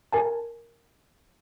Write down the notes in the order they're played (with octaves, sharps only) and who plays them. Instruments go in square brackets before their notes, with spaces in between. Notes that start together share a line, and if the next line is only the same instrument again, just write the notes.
[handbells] A#4 G#5 A5